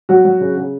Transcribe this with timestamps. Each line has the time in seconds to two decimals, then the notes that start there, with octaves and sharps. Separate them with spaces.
0.09 F#3 F#4
0.25 F#3
0.41 C#3
0.57 C#3